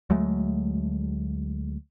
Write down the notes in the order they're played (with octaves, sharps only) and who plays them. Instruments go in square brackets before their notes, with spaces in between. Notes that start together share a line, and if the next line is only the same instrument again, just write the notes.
[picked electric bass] D2 F#3 G#3 A3